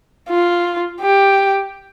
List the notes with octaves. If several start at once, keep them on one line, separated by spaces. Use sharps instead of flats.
F4
G4